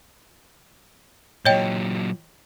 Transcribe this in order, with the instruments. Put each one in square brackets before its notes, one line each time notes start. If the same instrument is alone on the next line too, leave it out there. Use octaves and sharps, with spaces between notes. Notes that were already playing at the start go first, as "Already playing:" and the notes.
[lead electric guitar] A#2 F#3 [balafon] C#5 D#5 G5